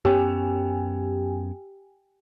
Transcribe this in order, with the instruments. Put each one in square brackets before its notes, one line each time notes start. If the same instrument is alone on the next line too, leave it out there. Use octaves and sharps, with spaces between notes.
[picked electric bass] F#2 B3 C#4 [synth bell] G4 G5 G#5